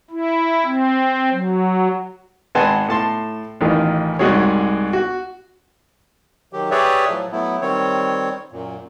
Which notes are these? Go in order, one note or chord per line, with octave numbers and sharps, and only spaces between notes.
E4
C4
F#3
G#1 B4 F#5 G#5 A5 C6
A2 A5 C6
A1 D#3 E3 F4
C2 G#2 F#4 G#4 C#5
F#4
D#3 F#3 G4
G4 G#4 B4 C#5 D5 E5
A2 F3 F#3
F#3 A3 B3 E4
D#3 G3 C4 C#5
F#2 A#2